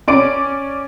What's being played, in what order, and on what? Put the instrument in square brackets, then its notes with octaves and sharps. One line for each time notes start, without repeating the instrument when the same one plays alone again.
[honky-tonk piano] C#4 D5 D6 D7